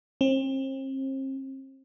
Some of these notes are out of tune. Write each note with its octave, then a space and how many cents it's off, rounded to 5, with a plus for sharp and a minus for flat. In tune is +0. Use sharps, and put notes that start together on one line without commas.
C4 +35